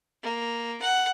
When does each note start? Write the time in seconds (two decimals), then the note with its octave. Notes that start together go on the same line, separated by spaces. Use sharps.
0.23 A#3
0.82 F#5